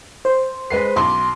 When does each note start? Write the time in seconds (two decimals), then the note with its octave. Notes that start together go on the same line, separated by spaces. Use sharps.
0.25 C5
0.70 G#3 B4 C7
0.96 B1 C6 D6